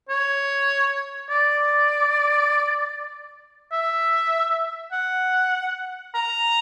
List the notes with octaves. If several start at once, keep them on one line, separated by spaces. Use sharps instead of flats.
C#5
D5
E5
F#5
A#5